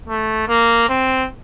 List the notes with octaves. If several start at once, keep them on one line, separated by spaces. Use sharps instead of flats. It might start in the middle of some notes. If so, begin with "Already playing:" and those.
A3
A#3
C4